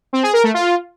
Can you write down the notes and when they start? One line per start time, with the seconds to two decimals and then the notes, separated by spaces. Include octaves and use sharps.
0.13 C4
0.23 G#4
0.33 A#4
0.44 A3
0.54 F4